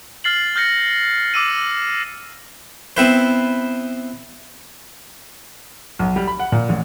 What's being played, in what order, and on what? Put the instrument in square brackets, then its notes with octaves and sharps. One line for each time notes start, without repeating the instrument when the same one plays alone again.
[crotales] F6 A6 C7 F#7
F6 G6 A#6 C#7
D6 E6 D#7
[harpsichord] B3 C4 E4 B4 C5
[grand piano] B1
G3
B5
F#5
A#2
A1